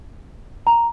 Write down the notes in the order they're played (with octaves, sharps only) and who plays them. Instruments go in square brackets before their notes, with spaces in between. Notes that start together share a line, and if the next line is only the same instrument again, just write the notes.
[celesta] A#5